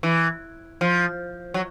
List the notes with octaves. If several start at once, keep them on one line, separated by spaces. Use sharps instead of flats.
E3
F3
F#3